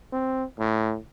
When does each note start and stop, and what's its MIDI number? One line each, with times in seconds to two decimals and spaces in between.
0.12 0.44 60
0.59 0.97 45